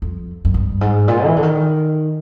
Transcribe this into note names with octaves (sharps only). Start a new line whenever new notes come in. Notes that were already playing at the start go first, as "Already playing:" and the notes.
F2
F#2
G2
G#2
A#2
E3
D3
D#3